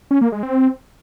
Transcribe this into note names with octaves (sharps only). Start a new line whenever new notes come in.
C#4
A#3
G#3
C4